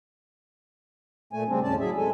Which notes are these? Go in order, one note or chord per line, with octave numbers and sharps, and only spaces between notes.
A#2 A3 G#5
C#3 G3 C4 D4
D#2 A2 C#4 D5 A5
F#3 E4 G#4 E5
C3 G#3 A4 G#5